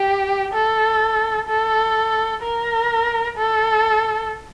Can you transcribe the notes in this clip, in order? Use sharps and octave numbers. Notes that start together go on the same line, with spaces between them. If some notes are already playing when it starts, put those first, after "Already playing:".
Already playing: G4
A4
A4
A#4
A4